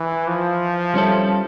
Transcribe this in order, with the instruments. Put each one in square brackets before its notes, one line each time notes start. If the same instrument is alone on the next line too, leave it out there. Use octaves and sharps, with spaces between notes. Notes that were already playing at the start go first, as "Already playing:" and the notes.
Already playing: [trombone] E3
F3
[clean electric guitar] G3 C#4 E4 A4